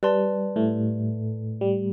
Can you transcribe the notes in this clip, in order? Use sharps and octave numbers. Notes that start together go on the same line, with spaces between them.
G3 B4 D5 A5 C6
A2 A3
G3